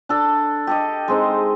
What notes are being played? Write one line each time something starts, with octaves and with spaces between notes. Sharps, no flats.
D4 A4 D5
G4 A4 D#5
G#3 C4 D#4